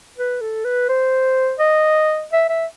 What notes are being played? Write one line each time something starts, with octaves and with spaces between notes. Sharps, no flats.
B4
A4
B4
C5
D#5
E5
E5